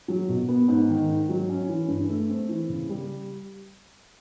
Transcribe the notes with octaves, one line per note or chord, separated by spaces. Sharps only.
F#3
B2
B3
G#2
D#3
G#2
F#3
C#4
E3
G2
A3
C4
E3
C#3
G3